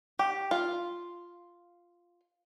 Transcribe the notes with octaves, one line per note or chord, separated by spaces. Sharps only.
G4
F4